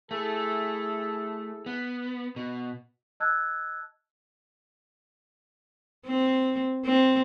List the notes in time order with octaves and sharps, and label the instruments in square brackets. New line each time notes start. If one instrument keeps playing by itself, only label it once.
[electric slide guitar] A3 [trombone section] E4 G#4 A4
[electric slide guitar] B3
B2
[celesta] D#5 A5 E6 F#6 G#6
[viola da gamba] C4
C4